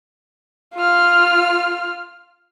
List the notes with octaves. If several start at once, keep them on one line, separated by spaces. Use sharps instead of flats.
F4 F6